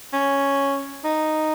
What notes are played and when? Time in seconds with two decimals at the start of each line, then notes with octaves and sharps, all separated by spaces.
0.13 C#4
1.04 D#4